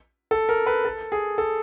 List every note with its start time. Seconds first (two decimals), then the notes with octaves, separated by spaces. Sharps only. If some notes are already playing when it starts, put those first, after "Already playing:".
0.31 A4
0.49 A#4
0.66 B4
0.85 A4
1.12 G#4
1.38 A4